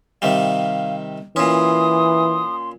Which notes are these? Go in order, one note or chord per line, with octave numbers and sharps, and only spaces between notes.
C3 D#3 G3 F5
A#2 E3 C#4 C6 D#6